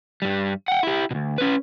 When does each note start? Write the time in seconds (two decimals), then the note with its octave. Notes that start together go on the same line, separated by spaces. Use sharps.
0.22 G2 G3
0.68 F#5 G5
0.83 E4 G4
1.11 D2 B2
1.38 C#4 B4